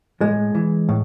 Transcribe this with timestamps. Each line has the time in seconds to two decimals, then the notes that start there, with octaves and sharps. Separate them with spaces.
0.21 A2 G#3
0.55 E3
0.89 A2